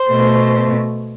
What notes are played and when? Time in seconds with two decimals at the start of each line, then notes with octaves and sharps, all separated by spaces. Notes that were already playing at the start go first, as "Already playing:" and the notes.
Already playing: C5
0.10 B2 A3